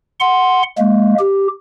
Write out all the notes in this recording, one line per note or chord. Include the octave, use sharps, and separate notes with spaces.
F#5 C6
G#3 A#3
G4